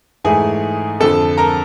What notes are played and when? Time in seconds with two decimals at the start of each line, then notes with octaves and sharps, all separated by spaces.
0.24 G#2 E3 A3 G#4 G#5
1.00 F2 D3 F3 A4 A5
1.37 A#4 A#5